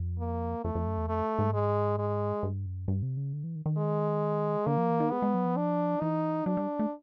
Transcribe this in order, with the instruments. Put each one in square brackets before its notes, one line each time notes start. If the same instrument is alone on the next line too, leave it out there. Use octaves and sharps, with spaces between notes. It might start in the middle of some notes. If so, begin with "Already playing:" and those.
Already playing: [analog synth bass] F2
[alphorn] A#3
[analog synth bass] F2 [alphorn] A3
[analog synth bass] F2
F#2
E2
[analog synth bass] F2 [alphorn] A3
[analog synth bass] G#2
[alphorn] G#3
G#3
[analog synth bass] G2
F#2
G2
C3
C#3
D3
E3
D#3
D#3
[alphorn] G#3
[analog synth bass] D3 [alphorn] A#3
[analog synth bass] F3
E3
D#3
[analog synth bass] G#3 [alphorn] B3
[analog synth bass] G#3
F#3
F3
[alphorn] D4
[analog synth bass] E3 [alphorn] D#4
[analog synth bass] F#3 [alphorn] D4
[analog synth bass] G3
A3